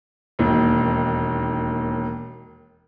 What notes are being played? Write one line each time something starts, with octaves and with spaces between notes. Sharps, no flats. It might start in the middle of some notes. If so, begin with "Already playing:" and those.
E1 D#2